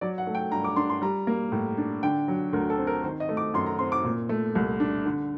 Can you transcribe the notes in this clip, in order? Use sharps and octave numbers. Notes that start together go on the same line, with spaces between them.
F#3 D5
F#5
A3
G5
G2 A#5
D6
D4 C6
C6
G3 A#5
A#3
A2
D4
D3 G5
F#3
D2 A#4
A4
C4
A#4
D#3 C5
D#5
A3
D6
F#2 C6
A#5
C4 C6
D6
A#2
A3
C2
D4
D3